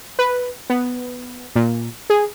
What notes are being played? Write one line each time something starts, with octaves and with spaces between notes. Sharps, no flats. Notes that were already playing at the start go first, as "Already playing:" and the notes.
B4
B3
A#2
G#4